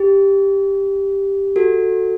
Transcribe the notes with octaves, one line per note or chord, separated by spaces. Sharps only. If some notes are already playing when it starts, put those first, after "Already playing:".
Already playing: G4
F#4 A4